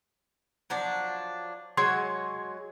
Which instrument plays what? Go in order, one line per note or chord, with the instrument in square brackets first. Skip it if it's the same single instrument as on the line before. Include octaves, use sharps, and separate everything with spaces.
[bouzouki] F3 F#3 D4
[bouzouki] F#3 G#3 C#5 [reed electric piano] C6 G#6